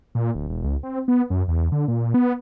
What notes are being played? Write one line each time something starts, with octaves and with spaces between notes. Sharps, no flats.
A#2
D1
E1
C#2
C4
B3
F#2
E2
D3
A#2
B3